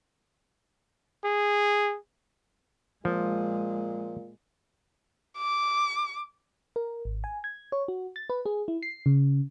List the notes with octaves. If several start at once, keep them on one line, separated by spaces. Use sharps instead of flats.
G#4
A#2 F3 G#3
D6
A#4
G#1
G#5
G#6
C#5
F#4
A6
B4
G#4
E4
C7
C#3